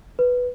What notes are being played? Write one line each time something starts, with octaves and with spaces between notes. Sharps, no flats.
B4